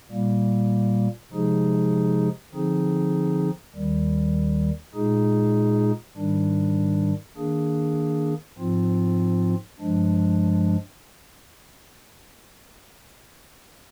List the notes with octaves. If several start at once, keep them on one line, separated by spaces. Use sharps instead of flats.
A#2 G3 A#3
C3 F3 G#3 D#4 G#4
D3 F3 C4 D#4 G#4
D#2 D#3 G3
A#2 G#3 D#4 G#4
G#2 D#3 G3 D4
D#3 A#3 D4 G#4
G#2 F3 C4 F4
G2 F3 G#3 D4